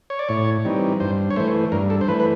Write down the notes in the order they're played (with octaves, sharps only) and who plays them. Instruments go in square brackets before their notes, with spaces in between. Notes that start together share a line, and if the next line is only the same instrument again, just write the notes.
[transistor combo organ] C#5
D5
A2 C#5
E3 G3 C4 D#4
G2 C5
C#5
E3 A3 C5
G2 A#4
A4
C5
E3 A3 B4
B4